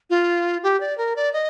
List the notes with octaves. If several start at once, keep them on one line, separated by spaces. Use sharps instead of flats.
F4
G4
D5
A#4
D5
D#5